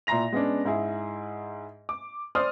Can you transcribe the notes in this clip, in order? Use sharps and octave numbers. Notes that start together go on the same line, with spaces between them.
A#2 E4 A#5 C6 A#6 F7
G#3 B3 C#4 D4
G#2 E4 G#4
D6
C5 D5 C6 D#6 F6